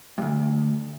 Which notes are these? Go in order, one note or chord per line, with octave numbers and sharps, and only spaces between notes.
D2 G2